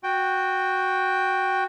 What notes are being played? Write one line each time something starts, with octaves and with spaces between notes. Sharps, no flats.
F#4 G5